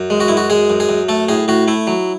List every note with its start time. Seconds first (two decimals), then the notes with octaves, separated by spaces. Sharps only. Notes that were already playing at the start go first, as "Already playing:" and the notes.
Already playing: F#2
0.10 G#3
0.20 F#4
0.28 F#2 E4
0.37 F#4
0.50 G#3 G#4
0.70 F#2
0.80 G#4
0.89 F#2
1.09 A3 A4
1.29 A2 G#4
1.48 A2 F#4
1.68 A3 E4
1.87 F#3